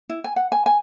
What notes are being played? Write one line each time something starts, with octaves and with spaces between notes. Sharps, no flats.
E4
G#5
F#5
G#5
G#5